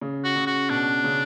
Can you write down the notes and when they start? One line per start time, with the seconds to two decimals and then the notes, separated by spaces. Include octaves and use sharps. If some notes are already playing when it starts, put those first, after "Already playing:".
0.01 C#3
0.24 F#4
0.36 C#3
0.47 F#4
0.70 B2 D4
1.04 C#3